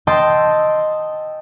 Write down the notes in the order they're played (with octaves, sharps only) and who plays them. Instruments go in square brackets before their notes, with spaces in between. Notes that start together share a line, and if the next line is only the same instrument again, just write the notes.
[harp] D#5 G5 A5 C6 E6